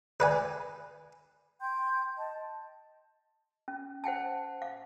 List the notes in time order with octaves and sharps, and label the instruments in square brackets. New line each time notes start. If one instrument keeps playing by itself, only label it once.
[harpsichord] B4 D5 G#5
[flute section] G5 C6 G6
D#5 A5
[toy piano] C#4
C5 F#5 G5 A5
F5